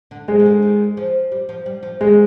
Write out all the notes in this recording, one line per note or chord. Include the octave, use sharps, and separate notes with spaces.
D3
C3 G#3
D#3
D3
D#3
F3
G3
F3
G3
F3
D#3 G#3